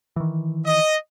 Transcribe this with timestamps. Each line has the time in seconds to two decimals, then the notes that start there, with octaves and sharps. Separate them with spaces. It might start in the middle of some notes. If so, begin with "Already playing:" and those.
0.16 D#3 E3
0.66 D#5